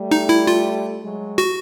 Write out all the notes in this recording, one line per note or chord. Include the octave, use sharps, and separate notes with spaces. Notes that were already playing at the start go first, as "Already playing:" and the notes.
Already playing: G3 A3
D#4
E4
F4
F#3 G#3
F#4